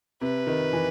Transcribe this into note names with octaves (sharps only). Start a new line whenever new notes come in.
C3 B4
D#3
E3